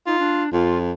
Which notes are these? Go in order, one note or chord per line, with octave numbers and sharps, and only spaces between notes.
D#4 F4
D4
F2 F4